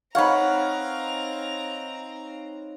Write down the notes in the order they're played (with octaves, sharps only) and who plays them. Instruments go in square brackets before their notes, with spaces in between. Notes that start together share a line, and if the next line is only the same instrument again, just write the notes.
[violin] C4 A#5 [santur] D#4 C#5 F5 [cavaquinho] B4 F#5